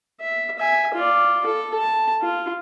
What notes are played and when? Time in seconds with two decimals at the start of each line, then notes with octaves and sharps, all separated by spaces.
0.20 E5
0.59 E5 G#5
0.94 F4 D5
1.46 A4
1.75 A5
2.22 F4